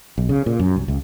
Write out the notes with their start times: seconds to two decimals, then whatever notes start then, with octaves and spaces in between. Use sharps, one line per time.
0.18 B1
0.29 C#3
0.46 A#2
0.59 F#2
0.76 C2
0.88 C#2